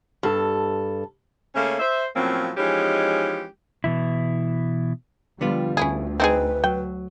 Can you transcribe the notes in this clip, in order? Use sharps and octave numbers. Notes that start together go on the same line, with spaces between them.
G2 A4
C#3 A3 A#3 C#4
C5 E5
A2 F3 F#3 A#3 C4 C#4
E3 F3 G#3 C#4 D#4 G4
B2 E3 E4
D3 F3 G3 B3 F4
D2 C#4 E4 G#4
C4 D#4 G#4 B4
F#3 G5